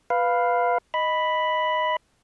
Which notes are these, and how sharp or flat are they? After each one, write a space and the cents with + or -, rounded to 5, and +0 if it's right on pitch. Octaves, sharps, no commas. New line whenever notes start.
B4 +0 F5 +0
D#5 +0 B5 +0